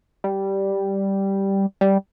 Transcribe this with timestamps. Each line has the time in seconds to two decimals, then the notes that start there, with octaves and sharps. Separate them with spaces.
0.24 G3
1.81 G3